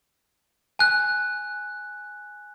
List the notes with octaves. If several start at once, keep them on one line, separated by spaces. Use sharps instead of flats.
G#5 F#6